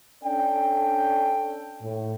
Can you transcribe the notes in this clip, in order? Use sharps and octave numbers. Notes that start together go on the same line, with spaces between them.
C#4 D4 A4 D5 G5
A2